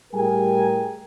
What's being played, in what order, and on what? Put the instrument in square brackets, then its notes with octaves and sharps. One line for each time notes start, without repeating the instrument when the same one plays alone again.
[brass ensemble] A2 G3 G#4 A#4 G5 G#5